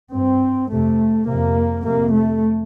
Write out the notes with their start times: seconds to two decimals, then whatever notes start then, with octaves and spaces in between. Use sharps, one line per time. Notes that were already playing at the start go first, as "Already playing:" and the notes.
0.13 G2 C4
0.71 F2 C3 A3
1.27 F2 C3 A#3
1.84 F2 C3 A#3
2.12 A3